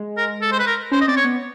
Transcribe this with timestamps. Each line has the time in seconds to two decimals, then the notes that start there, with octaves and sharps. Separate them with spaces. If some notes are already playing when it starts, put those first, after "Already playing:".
Already playing: G#3
0.17 A#4
0.41 A4
0.52 C5
0.59 B4
0.67 A#4
0.91 C#4 C5
1.01 D#5
1.08 C4 D5
1.16 C#5
1.24 B3